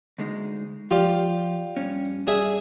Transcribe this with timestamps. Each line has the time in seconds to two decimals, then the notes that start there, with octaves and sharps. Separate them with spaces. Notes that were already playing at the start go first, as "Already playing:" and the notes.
0.18 D2 G#3 D#4
0.91 F3 F4 G4 D5
1.77 G2 C#4
2.27 G2 D4 G#4 E5